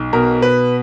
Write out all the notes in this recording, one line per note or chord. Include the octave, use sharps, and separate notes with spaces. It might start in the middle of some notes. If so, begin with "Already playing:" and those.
Already playing: B1
B2 A#4
B4